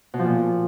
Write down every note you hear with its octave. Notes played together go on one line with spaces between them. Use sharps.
B2
F3
A#2